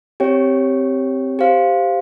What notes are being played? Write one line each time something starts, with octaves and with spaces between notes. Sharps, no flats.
C4 G4 C#5 G5
G4 C5 F5